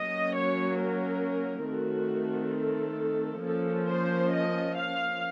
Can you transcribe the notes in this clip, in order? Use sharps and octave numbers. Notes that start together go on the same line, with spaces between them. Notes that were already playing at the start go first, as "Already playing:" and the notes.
Already playing: F#3 A#3 C#4 D#5
C#5
A#4
D#3 A3 C4 F#4
A4
F3 A#3 C#4 A4
C5
D#5
F5